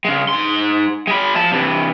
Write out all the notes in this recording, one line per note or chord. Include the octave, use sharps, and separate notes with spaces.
C#3 G#3
G#2 C6
G#3 B5
F3 A5
C3 E3